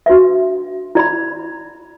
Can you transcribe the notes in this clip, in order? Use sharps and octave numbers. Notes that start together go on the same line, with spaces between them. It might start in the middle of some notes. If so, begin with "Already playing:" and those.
D4 F#4 B4 E5
E4 D5 B5